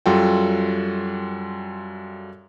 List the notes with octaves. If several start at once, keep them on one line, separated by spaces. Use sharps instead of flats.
F#2 G3 F4 F#4 A4 G5